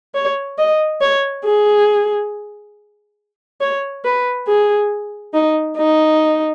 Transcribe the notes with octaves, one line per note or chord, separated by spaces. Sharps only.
C#5
D#5
C#5
G#4
C#5
B4
G#4
D#4
D#4